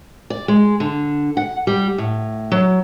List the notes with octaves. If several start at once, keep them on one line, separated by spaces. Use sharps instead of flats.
D5
G#3
D3
F#5
G3
A2
F#3